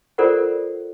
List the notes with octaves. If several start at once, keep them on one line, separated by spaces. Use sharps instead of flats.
F4 A4 A#4 C5 D5 F#5